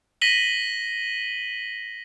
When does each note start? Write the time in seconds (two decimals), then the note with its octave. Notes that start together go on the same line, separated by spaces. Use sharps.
0.21 A#6 B6 D#7 F#7 G7